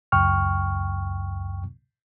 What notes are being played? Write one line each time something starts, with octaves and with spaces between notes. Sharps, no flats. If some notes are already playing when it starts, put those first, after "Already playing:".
C#2 F#2 G5 C#6 F6